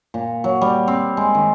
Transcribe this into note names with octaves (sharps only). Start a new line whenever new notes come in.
A#2
F#3
G3
C4
G#3
D#3